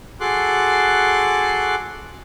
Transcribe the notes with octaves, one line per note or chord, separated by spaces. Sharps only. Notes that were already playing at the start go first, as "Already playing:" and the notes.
F#4 G#4 A4 C6 D6 F#6